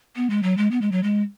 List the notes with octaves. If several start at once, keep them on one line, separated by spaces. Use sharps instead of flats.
B3
G#3
F#3
G#3
B3
G#3
F#3
G#3